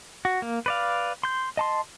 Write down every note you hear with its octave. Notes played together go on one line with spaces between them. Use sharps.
F#4
A#3
B4 D5 F5
C6 G6
D#5 A5 C6